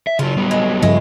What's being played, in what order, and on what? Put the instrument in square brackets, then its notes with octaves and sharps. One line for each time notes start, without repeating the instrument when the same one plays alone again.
[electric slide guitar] E5
[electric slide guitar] C#3 F#3 [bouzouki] F4
[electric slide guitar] F#3 G3 B3
[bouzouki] G#3
[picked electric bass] G2 C#3 F3 [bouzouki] G#3 A3 E4